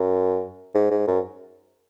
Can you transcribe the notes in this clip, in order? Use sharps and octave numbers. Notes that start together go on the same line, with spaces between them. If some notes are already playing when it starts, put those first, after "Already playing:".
Already playing: F#2
G#2
G#2
F#2